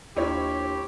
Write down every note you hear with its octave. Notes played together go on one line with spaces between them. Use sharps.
D#2 D4 E4 F4 G4 C5 C#5